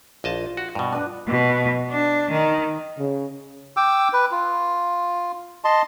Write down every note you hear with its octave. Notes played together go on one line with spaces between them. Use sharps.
A#1 F4 D#5 A5
F#4
G2 B2
D4 B4
B2
D4
D#3
C#3
G5 D6 E6
B4
F4
D#5 A5 C6